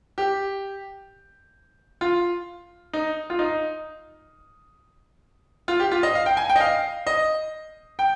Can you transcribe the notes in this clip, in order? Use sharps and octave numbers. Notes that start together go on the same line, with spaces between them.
G4
F4
D#4
F4
D#4
F4
G4
F4
D#5
F5
G5
G#5
G5
D#5
F5
D#5
G5